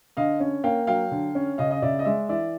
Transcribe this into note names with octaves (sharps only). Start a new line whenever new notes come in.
D3 D#5 F5
C#4
A#3 F5 G5
F#3 F5 G5
D3
C#4
C#3 D#5 F5
D#5
C#3 D5 E5
D#5
G#3 D5 E5
E3 D5 E5